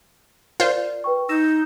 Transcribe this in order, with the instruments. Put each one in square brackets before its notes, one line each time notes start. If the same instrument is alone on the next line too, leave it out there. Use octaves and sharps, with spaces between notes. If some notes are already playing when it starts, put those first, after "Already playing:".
[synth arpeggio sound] F4 C5 [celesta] A#4 D5
[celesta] B4 G5 C#6
[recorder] D#4 [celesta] E6 A#6 E7